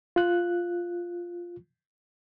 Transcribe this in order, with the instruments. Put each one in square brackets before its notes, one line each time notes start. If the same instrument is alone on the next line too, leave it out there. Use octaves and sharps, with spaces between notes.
[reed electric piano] F4 F#6